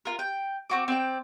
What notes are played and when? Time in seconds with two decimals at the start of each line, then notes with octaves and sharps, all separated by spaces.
0.05 F4 A#4
0.19 G5
0.70 C4 F#4 D6
0.88 C4 D5 G5